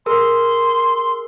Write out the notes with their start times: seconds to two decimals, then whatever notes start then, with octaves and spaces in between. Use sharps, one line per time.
0.06 G#4 A#4 C6 E6